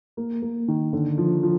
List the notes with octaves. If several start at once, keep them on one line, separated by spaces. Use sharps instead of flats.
A#3
A#3
D#3
D3
F3
F3